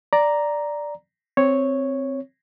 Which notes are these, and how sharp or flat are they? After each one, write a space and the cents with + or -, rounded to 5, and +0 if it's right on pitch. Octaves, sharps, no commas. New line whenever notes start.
D5 +0 A#5 +0
C4 +0 C#5 +0